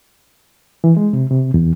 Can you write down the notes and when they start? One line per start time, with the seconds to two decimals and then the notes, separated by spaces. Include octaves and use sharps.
0.84 E3
0.97 G#3
1.13 C3
1.31 C3
1.54 E2